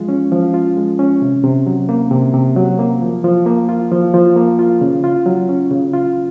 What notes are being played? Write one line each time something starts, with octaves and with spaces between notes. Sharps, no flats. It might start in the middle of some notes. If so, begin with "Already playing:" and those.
Already playing: F3 G#3 F4
C#4
F3
F4
G#3
C#4
C3
C3
F#3
A#3
C3
C3
F#3
A#3
F3
F3
A#3
F4
F3
F3
A#3
F4
C#3
F4
F#3
C#4
C#3
F4